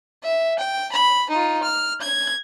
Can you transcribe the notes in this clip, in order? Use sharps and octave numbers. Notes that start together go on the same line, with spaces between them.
E5
G5
B5
D#4 F4
F6
G#6